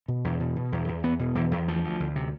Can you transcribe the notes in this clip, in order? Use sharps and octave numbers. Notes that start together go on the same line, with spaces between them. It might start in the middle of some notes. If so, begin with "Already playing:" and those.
B2
E2
B2
B2
E2
E2
E2 B3
B2
E2 E3
E2
D2 F3
D2
D2
C3